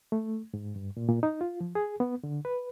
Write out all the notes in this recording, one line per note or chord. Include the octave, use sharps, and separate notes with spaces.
A3
G#2
G2
A#2
A#2
D#4
F4
F3
G#4
B3
D3
B4